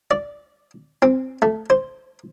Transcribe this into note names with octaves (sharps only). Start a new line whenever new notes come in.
D5
C4
A3
C5